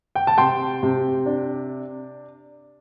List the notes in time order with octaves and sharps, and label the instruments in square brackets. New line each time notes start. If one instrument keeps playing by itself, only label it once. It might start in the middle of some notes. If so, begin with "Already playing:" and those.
[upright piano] G5
A5
C3 G5 C6
C3
D4